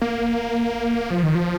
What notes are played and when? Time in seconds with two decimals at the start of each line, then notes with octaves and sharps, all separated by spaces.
0.02 A#3
1.11 F3
1.23 D#3
1.35 F3